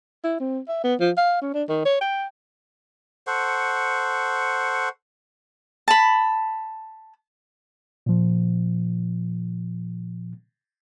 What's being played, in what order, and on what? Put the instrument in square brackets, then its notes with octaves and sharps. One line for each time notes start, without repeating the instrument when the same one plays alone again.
[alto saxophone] E4
C4
E5
B3
F3
F5
C#4
D4
D#3
C#5
G5
[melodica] A4 C5 F#5 C#6
[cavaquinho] A5 B5
[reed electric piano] A#2 F3